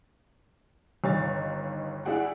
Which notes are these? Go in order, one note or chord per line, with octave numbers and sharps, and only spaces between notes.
G1 D#3 C#5 A6
D4 E4 F#4 G#4 F#5 G5